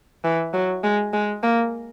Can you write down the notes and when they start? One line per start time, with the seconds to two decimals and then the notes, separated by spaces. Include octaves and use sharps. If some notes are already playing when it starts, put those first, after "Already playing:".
0.24 E3
0.54 F#3
0.84 G#3
1.13 G#3
1.43 A#3